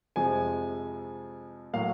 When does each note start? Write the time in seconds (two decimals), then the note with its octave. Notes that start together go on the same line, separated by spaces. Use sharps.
0.16 F2 C3 F3 G#3 G#5
1.73 A2 F#3 A#3 F5